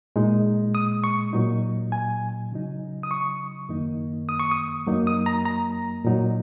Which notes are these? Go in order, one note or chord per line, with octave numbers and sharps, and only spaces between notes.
A#2 G#3 D#4
D#6
C#6
A#2 F#3 D#4
G#5
C#3 F#3 D#4
D#6
C#6
F#2 D#3 A#3 D#4
D#6
C#6
D#6
F#2 F#3 A#3 D#4
D#6
A#5
A#5
A#2 F#3 D#4